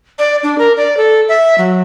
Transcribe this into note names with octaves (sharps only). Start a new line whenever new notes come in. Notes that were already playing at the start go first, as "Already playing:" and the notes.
D5
D4
A#4
D5
A4
E5
F#3